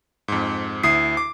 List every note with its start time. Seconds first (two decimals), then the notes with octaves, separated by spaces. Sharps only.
0.28 F2 G#2
0.84 D2 E4 D#6 C7
1.17 D6